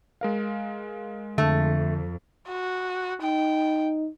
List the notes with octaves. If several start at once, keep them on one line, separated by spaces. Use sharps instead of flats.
G#3 A#4 F5
F2 D3 A3
F#4
D#4 G5